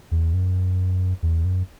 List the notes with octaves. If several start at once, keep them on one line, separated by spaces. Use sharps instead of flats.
E2
F#2
E2
F#2